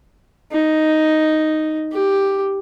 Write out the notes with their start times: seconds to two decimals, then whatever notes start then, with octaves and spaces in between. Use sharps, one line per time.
0.52 D#4
1.92 G4